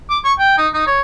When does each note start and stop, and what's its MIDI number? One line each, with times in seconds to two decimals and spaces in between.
0.10 0.18 86
0.24 0.33 85
0.39 0.57 79
0.58 0.68 63
0.74 0.82 63
0.87 1.01 73